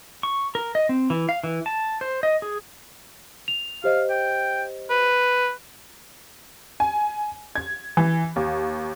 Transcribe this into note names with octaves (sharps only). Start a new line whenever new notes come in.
C#6
A#4
D#5
C4
E3
F5
E3
A5
C5
D#5
G#4
F7
G4 C5 D#5 F5
G5
B4
G#5
G#6
E3
D#2